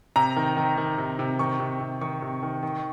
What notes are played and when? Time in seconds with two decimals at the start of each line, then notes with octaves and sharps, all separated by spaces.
0.16 C3 A#5
0.36 D#3
0.57 D#3
0.78 D#3
0.98 C3
1.19 C3
1.39 D#3 C#6
1.60 C3
1.80 C3
2.01 D#3 C#6
2.22 C3
2.42 D#3
2.63 D#3